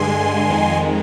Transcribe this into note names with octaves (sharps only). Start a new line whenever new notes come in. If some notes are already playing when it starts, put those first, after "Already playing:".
Already playing: G2 D3 G#3 G#5 C6
F2 D#3 G#3